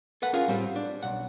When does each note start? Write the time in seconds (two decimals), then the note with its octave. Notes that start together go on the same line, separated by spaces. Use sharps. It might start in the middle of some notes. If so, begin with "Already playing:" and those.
0.22 A4 B4 F#5
0.33 C#4 F4 G#4 A#4
0.48 A2 G3 C4
0.76 D4
1.03 B1 F#5